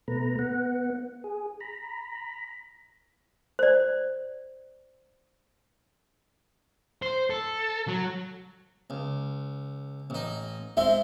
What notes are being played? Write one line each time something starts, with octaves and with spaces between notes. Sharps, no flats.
B2 A3 B4 A#5
B3 F#5
G#4
A#5 B5
C5 D5
C5
A4
F#3
C#2
A1 D#4
G#3 C4 E5